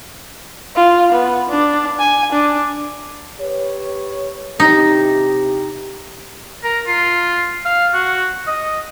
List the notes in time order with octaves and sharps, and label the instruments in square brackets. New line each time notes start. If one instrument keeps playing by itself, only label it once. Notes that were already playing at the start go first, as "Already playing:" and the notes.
[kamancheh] F4
B3
D4
G#5
D4
[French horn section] G4 B4 C#5
[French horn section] C3 E4 G4 [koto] D#4
[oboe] A#4
F4
F5
F#4
D#5